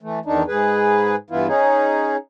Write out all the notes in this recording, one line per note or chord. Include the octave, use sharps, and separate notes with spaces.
E3 A3
E2 D#3 D4 D#4
G#2 G#4 B4
G2 E3 B3 E4 F4
C#4 D#4 G#4